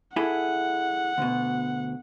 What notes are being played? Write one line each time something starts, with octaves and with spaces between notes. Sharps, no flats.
E4 G#4 A4 F#5
D2 B2